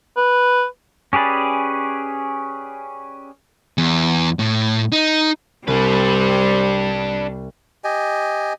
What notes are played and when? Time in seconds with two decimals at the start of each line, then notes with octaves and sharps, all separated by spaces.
0.17 B4
1.13 C#4 G4 G#4 B4 D5
3.78 E2
4.39 A2
4.92 D#4
5.68 C2 G3 C4 D4 B4 B5 D#7
7.84 G4 D#5 G#5